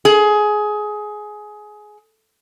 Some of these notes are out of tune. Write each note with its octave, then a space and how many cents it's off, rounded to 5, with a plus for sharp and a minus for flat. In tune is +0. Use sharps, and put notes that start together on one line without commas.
G#4 +15